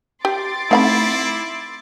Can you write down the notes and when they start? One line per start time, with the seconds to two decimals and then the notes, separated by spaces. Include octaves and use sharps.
0.25 G4 C6 D6 A6
0.71 A3 C4 D#4 E4 F5 B5